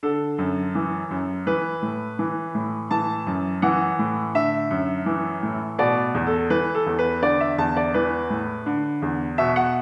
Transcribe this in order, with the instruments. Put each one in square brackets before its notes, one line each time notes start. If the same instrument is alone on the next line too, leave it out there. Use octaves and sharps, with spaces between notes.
[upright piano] D3 A4
F#2
E3
F#2
E3 B4
A2
E3
A2
E3 A5
F#2
E3 F#5
A2
D3 E5
F#2
E3
A2
B2 D5
E2
A4
E3 B4
A4
E2
B4
D3 D5
E5
E2 A5
D5
E3 B4
A2
D3
E2
B2 E5
F#5